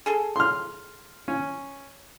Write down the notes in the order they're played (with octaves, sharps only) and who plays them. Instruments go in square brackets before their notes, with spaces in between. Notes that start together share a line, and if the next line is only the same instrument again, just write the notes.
[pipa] G#4 A4
[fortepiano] C6 F6
C#4